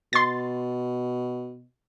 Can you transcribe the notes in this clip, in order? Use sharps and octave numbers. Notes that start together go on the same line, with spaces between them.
B2 C6 A6